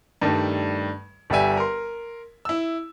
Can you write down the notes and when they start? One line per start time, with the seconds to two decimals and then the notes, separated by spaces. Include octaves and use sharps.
0.21 G2 D#3 G3 A3
1.30 G1 G3 G4 E5 G#5
1.57 A#4 C6
2.45 E4 E6